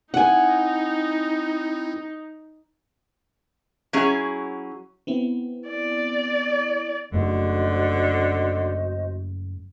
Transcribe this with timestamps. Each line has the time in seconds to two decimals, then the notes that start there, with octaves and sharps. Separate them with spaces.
0.14 C4 D#4 E4 F#5 G#5
3.93 F#3 C#4 E4 G#4
5.07 B3 C4 E4
5.68 D5
7.12 F#1 F#2 D3 A3 F#4 C5 D#5